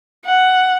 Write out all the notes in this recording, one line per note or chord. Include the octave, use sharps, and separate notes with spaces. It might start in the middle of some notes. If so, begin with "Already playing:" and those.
F#5